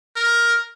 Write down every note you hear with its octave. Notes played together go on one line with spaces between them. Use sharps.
A#4